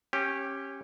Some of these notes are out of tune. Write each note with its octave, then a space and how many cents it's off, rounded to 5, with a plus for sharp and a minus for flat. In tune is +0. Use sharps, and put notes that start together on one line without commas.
C#4 -20 G4 +0